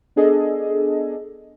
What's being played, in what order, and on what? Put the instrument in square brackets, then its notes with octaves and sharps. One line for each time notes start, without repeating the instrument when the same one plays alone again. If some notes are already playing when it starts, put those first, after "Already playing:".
[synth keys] B3 D4 G#4 A4 D#5